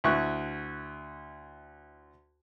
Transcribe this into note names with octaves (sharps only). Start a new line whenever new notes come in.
D2 E4 C#6 F#6